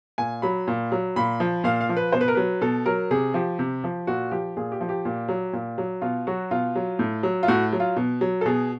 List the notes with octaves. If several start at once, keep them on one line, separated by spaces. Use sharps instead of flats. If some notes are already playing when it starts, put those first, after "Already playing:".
A#2 G#5
F#3 B5
A#2
F#3
A#2 B5
F3
A#2 F5
F5
F3
B4
B2 C5
B4
A#4
F#3 B4
B2 A4
F#3 A#4
C3 G#4
F3 G4
C3
F3
A#2 F#4
F3 G4
A#2 G#4
G4
F3
G4
A#2
F#3
A#2
F#3
B2 F4
F#3 F#4
B2 F4
F#3
A2
F#3
F4
A2 F#4
F#3
F4
B2
F#3
A4
B2 G#4